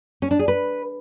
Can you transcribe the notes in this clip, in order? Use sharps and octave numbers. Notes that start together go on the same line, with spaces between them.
C#4
D4
G#4
B4